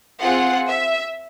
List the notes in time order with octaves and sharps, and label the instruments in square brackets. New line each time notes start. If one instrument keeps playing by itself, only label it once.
[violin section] C4 F4 G#4 F#5
E5